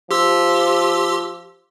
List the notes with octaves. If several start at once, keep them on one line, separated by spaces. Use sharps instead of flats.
F3 G4 C6 E6